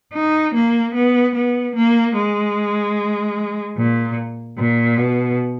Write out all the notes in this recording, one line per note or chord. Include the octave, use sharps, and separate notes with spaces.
D#4
A#3
B3
B3
A#3
G#3
A#2
A#2
B2